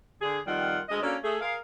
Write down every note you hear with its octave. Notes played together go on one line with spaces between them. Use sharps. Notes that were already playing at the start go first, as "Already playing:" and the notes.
D3 G#4
F2 D#3 G3 F4 F#5
D2 G#3 D#5
A#3 C#4 D4 F#4 A4
A3 G#4
G#4 A#4 F5